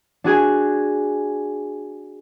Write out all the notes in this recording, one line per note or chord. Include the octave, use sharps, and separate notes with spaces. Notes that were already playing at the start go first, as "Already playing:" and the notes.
D4 F#4 G#4 G#5